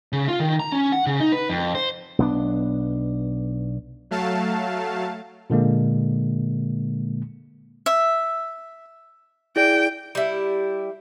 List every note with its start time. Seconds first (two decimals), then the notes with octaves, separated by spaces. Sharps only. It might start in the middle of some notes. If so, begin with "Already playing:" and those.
0.13 C#3
0.28 F4
0.40 D#3
0.60 A#5
0.72 C#4
0.92 F#5
1.06 C#3
1.20 D#4
1.32 B4
1.50 F2
1.75 C5
2.18 B1 B3 D4
4.11 F#3 A3 F5 A5
5.50 A#2 D3 G#3 A#3
7.86 E5
9.56 E4 G#4 D5 G5
10.15 G3 E4